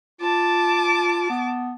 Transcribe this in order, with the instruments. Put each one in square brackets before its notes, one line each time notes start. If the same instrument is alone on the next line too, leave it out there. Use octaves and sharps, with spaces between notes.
[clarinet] F4 [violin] A5 D6
[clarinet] B3